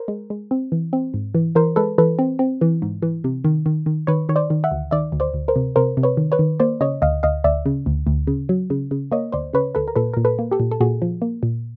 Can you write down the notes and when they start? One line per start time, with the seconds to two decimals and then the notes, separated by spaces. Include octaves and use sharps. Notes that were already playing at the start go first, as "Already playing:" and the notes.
Already playing: A#4 C5
0.08 G#3
0.30 G#3
0.51 C4
0.72 E3
0.93 C4
1.14 G#2
1.35 E3
1.55 E3 A#4 C5
1.76 G#3 A4 B4
1.98 E3 A4 B4
2.19 C4
2.39 C4
2.61 E3
2.82 G#2
3.02 E3
3.24 C3
3.44 D#3
3.66 D#3
3.86 D#3
4.07 D#3 B4 C#5
4.29 D#3 C#5
4.36 C5 D5
4.50 D#3
4.64 E5 F#5
4.71 D2
4.91 D#3 D5 E5
5.12 D2
5.20 C5 D5
5.34 D2
5.48 A#4 C5
5.55 C3
5.76 C3 A#4 C5
5.97 C3
6.03 B4 C#5
6.17 D#3
6.32 B4 C#5
6.39 D#3
6.60 A#3 C5 D5
6.81 C#3 C#5 D#5
7.02 D2 D#5 F5
7.23 D2 D#5 F5
7.44 D2 D5 E5
7.66 C#3
7.86 D2
8.07 D2
8.27 C#3
8.49 F#3
8.70 C#3
8.91 C#3
9.12 A#3 C#5 D#5
9.32 D2 C5 D5
9.53 C#3 B4 C#5
9.75 D2 A4 B4
9.88 A#4
9.95 A#2 A4 B4
10.14 A#2 A#4
10.25 A4 B4
10.39 A#3
10.51 G4 A4
10.60 A#2
10.71 A4
10.80 A#2 F#4 G#4
11.02 F3
11.22 A#3
11.43 A#2